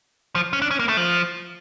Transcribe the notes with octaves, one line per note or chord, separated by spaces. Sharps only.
F3
C#4
D4
C#4
A#3
A3
F3